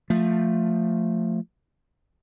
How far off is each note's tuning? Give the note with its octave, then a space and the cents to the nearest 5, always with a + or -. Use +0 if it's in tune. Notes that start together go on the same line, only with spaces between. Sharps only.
F3 +10 A3 +15